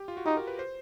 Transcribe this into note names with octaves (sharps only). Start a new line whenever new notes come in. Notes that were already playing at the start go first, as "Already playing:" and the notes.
Already playing: G4
F4
F#4
D#4 G4
A#4
B4
C5